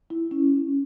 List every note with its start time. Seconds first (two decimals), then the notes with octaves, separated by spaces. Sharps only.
0.10 E4
0.31 C#4